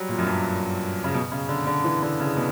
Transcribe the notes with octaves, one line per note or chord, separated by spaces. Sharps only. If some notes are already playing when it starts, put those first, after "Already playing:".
Already playing: F#3 G3
A#2
F#2
G2
C#3
B2
C#3
D3
D3
E3
D3
C#3
B2